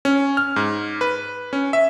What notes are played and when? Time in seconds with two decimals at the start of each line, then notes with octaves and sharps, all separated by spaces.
0.05 C#4
0.37 F6
0.56 G#2
1.01 B4
1.53 C#4
1.73 E5